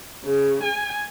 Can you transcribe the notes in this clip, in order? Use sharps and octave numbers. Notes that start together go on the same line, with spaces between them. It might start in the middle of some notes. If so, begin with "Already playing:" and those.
C#3
G#5